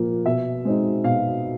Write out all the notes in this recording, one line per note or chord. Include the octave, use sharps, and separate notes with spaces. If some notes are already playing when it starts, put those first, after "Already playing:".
Already playing: A#2 F3 A#3
B2 E5
G#3 C4 D#4
B2 F5